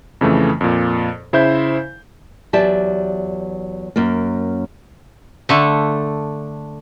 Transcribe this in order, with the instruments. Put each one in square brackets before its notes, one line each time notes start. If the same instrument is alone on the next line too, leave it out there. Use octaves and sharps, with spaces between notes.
[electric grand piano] F2 C#3 E3 A3
F2 A#2
C#3 E4 C5 E5 G6
[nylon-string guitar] E2 F#3 G4 D5 E5 A5
F#2 A#3
[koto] D3 A3